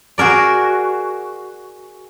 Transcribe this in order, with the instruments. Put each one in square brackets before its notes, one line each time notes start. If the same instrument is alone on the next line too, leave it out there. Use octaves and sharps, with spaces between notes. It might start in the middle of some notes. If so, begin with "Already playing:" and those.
[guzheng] F#4 G#4 A#4 D5